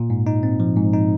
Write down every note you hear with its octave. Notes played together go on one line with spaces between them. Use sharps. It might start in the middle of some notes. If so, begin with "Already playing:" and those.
Already playing: A#2
G#2
D#4
C4
F3
G#2
D#4